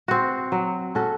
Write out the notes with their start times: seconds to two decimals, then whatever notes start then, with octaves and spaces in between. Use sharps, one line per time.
0.08 C4 F#4
0.52 F#3
0.95 C#4 F#4 A4